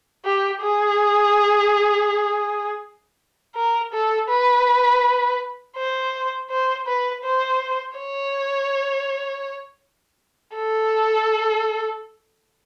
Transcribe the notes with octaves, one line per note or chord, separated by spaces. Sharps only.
G4
G#4
A#4
A4
B4
C5
C5
B4
C5
C#5
A4